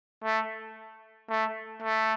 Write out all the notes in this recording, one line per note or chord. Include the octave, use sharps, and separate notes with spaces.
A3
A3
A3